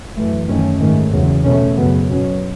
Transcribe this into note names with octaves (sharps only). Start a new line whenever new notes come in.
F#2 E3 A3
F#2 D#3 A3 C#4
G#2 D#3 A3 C#4
E2 C#3 F#3
B2 A3 C#4
F#2 C#3 F#3 B3
B2 F#3 C#4